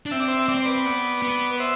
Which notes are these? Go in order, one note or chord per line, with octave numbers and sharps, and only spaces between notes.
D4
C4 E5
D5
C5 E5
C4 D5
C5
B4 D5
B3
B3
C5 E5